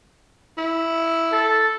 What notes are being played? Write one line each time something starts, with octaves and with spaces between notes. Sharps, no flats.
E4
A4